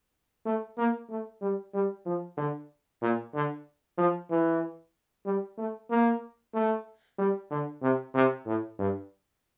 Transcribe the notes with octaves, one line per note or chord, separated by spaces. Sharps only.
A3
A#3
A3
G3
G3
F3
D3
A#2
D3
F3
E3
G3
A3
A#3
A3
G3
D3
C3
C3
A2
G2